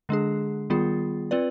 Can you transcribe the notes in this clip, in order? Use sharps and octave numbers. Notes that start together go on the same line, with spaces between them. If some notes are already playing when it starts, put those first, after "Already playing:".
D3 G#3 D4 G#4
D#3 G3 B3 F4 G#4
C4 F4 B4 D5